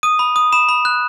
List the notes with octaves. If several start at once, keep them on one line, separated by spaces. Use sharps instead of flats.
D#6 D#7
B5
D#6
B5 E7
B5
F#6